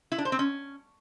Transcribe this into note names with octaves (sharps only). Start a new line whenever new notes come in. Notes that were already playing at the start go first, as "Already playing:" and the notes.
E4
D4
C5
C4
C#4